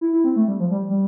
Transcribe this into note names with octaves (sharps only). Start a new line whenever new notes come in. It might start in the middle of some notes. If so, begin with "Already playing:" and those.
E4
E4
C4
A3
G3
F3
G3
G3